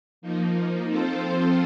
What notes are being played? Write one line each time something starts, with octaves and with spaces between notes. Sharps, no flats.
F3 A#3 D#4
F3 C4 F4 A4 C5